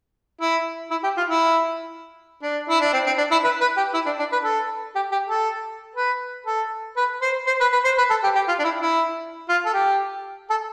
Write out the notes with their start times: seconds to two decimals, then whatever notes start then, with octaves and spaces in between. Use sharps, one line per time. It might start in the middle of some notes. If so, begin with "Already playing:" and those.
0.41 E4
0.91 E4
1.04 G4
1.17 F4
1.29 E4
2.42 D4
2.69 E4
2.80 D4
2.93 C4
3.06 C4
3.18 D4
3.31 E4
3.44 B4
3.61 B4
3.77 G4
3.94 E4
4.06 D4
4.19 D4
4.32 B4
4.44 A4
4.95 G4
5.12 G4
5.29 A4
5.95 B4
6.46 A4
6.97 B4
7.22 C5
7.47 C5
7.60 B4
7.72 B4
7.84 C5
7.98 B4
8.10 A4
8.23 G4
8.35 G4
8.48 F4
8.59 D4
8.64 E4
8.82 E4
9.49 F4
9.66 A4
9.74 G4
10.50 A4